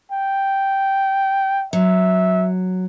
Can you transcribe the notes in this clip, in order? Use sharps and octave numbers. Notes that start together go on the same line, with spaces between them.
G5
F#3 E5